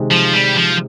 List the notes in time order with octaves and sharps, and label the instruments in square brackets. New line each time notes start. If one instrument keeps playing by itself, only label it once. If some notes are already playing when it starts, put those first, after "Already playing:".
Already playing: [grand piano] C3 D#3 G#3
[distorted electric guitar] F3
G3
F3